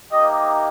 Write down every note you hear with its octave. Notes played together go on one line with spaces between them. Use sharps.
A#3 D#4 G4 D#5